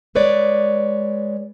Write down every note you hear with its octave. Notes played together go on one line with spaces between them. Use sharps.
G#3 B4 C#5 D5